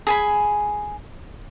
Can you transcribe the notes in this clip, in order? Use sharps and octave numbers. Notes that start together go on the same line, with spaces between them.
G#4 G#5 B5